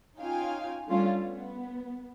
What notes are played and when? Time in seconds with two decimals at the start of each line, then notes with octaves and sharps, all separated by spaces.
0.19 C#4 D#4 F4 F5 G5 G#5
0.87 G3 A3 C#4 D4 F4 C#5
1.19 B3